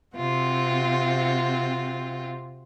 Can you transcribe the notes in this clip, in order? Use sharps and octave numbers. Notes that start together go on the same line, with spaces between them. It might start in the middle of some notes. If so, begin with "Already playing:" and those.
C3 C4 F4 F#4